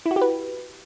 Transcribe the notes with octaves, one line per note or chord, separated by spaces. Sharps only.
E4
F#4
G4
B4